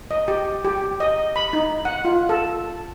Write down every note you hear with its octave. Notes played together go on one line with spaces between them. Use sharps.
D#5
G4
G4
D#5
B5
D#4
F#5
F4
A4